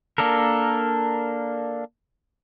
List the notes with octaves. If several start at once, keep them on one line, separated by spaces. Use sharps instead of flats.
A#3 D4 A4 A#4